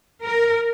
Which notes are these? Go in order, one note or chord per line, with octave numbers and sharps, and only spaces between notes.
A#4